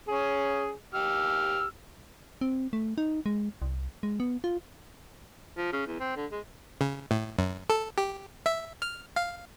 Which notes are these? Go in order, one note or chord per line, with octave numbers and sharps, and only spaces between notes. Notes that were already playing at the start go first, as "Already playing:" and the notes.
C#4 G#4
G4 E6 F6
C4
A3
D#4
G#3
C2
G#3
B3
F4
F3
C#3
E2
C4
D3
G#3
C#3
A2
F#2
A4
G4
E5
F6
F5